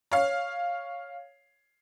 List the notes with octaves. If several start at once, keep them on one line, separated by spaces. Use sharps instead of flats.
C#5 F5